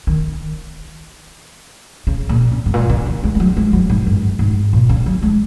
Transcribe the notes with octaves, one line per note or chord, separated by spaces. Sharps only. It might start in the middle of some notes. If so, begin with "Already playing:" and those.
D#3
C#3
A#2
C#3
G#2
A#2
C#3
D#3
G#3
G#3
F#3
G#3
F#3
G#2
F#2
G#2
A#2
C#3
F#3
G#3